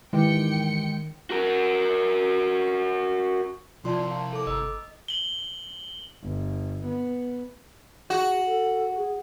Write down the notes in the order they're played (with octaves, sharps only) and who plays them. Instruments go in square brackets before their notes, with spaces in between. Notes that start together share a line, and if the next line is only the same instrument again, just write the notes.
[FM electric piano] G#2 E3 G4 [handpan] D#3 [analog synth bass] G#3 [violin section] G5 C#7
[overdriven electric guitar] F#4 A#4
[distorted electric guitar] C2 [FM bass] F3 [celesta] F4 D5 A5 [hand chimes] C6
[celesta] F5 A5 A#5
[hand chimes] A4 D6
[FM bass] G1 [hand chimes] D#5 [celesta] A#5 E6
[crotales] F#7 G7
[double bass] G1
B3
[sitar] F#4 [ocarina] G#4
[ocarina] A4
G#4